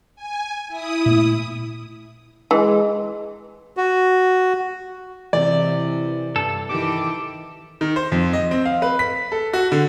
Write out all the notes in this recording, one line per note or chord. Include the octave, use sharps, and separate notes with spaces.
G#5
E4 D#6
A#2 A3 B3
E3 G#3
F#4
C3 E3 D5
G2 A4
D#3 E3 G4 D6
D#3
C5
F2
D#5
C4
F5
B4
B6
A4
F#4
D3